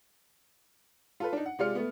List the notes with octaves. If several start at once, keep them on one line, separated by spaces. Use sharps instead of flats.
F4 A4 B4
D4 D#4
F#5
C3 G#3 F4 D5 F6 C#7
A3 B3